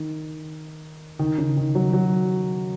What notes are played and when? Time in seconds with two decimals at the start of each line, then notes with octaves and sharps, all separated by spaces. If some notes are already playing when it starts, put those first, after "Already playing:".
Already playing: D#3
1.19 D#3
1.38 C#3
1.57 D#3
1.75 F#3
1.93 F#3